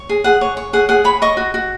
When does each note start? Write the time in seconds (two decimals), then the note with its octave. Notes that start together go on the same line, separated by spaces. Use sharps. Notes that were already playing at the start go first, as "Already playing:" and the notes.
Already playing: C#5
0.09 G#4
0.24 G#4 F#5
0.41 C#5
0.57 C#5
0.73 G#4 F#5
0.89 G#4 F#5
1.04 C#5 B5
1.22 D#5 C#6
1.37 F#4
1.54 F#4